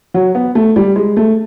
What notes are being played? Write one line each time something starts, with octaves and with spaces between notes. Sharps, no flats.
F#3
B3
A3
G3
G#3
A3